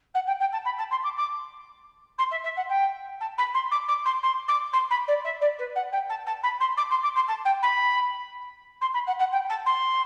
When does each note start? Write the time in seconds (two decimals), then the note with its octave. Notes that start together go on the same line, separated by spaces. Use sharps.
0.14 F#5
0.27 G5
0.40 G5
0.52 A5
0.65 B5
0.78 A5
0.90 C6
1.03 D6
1.17 D6
2.18 C6
2.31 E5
2.43 E5
2.56 F#5
2.69 G5
3.20 A5
3.38 B5
3.54 C6
3.71 D6
3.88 D6
4.05 C6
4.22 C6
4.48 D6
4.73 C6
4.90 B5
5.07 D5
5.24 E5
5.41 D5
5.58 B4
5.75 F#5
5.92 G5
6.09 A5
6.26 A5
6.43 B5
6.60 C6
6.77 D6
6.90 C6
7.03 D6
7.15 C6
7.28 A5
7.45 G5
7.62 B5
8.81 C6
8.93 B5
9.06 F#5
9.19 F#5
9.32 G5
9.49 A5
9.65 C6